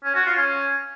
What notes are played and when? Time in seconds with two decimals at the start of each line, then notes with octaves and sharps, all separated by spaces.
0.05 C#4
0.15 F#4
0.26 F4
0.37 C#4